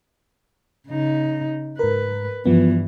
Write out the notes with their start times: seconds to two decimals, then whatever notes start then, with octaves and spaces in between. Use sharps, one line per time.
0.88 C#3 D#4
1.79 G#2 A#4 B4
2.46 G2 E3 F3 B3